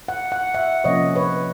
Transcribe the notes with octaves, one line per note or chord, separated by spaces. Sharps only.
F#5
F#5
E5 F#5
C3 F3 A#3 C#4 C#5 D#5
B4 C#5